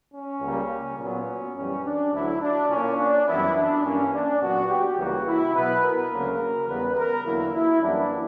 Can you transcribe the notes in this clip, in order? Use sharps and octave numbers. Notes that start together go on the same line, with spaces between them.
C#4
C#2 C#3 G3 A#3
A#2 F#3 B3 C#4
F#2 E3 G3 C#4
D4
D2 D3 F#3 E4
D4
A#2 A#3 C#4
D4
F#2 E3 G3 B3 E4
D4
G2 E3 A#3 C#4
D4
A#2 F#3 B3 F#4
G4
C#2 C#3 E3 G3 A#3 F#4
E4
B2 F#3 B3 B4
A#4
D2 C#3 F#3 A#3
E2 C#3 G3 B3 B4
A#4
E2 D3 F#3 A#3 E4
E4
F#2 E3 G3 A#3 D4